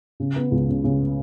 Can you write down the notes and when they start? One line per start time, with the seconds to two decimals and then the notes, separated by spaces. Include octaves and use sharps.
0.20 C#3
0.36 B3
0.51 C#2
0.69 C#3
0.84 C#3